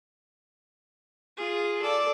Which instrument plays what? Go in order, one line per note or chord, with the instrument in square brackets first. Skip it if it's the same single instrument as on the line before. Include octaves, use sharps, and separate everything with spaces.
[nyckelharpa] F4 G#4
A4 D5